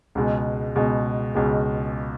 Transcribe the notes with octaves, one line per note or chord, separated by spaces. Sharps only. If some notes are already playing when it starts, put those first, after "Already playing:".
C#2 B2 G#3
C#2 B2 G#3
C#2 B2 G#3